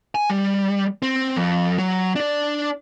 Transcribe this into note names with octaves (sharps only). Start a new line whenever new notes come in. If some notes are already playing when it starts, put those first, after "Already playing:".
G#5
G3
C4
F2
F#3
D4 D5